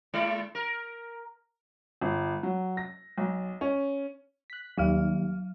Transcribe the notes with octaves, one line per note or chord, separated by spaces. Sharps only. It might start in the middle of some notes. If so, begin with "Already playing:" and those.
G#3 E4 D5
A#4
G1
F#3
A#6
B1
C#4
F#6 B6
D#2 F#3 G3 F5 F6